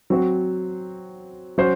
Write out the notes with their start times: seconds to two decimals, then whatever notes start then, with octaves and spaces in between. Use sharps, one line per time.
0.10 F#3 C4 F#4 C5
1.58 F#3 C#4 F#4 C5